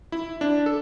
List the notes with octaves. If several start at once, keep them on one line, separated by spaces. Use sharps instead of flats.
E4
D4
A4